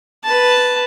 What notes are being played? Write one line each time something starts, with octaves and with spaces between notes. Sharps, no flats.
B4 A5